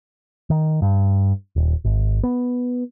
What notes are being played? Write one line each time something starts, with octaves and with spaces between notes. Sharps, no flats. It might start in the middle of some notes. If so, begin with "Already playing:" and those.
D#3
G2
D#1
G#1
B3